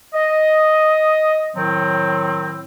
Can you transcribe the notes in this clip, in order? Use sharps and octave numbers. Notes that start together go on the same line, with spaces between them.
D#5
A2 D#3 F#3 C4